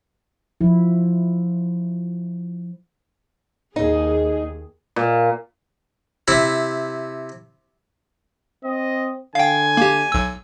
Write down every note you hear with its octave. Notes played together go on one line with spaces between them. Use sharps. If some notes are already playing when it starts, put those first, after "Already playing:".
F3 E4
D#2 D#4 G#4
A#2
C3 E4
C4 D#5
D3 F5 G5 G#5
A#3 G4
B1 E6